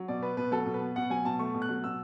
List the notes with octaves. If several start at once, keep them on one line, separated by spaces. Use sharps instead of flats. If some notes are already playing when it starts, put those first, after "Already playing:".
Already playing: F#3
B2 D5
B3 B4
B2 B4
F#3 A4
B2
B4
B3
B2 F#5
F#3 G#5
B2 A5
A3 C#6
B2
F#6
F#3
B2 E6